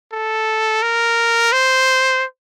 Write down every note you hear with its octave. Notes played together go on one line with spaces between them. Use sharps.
A4
A#4
C5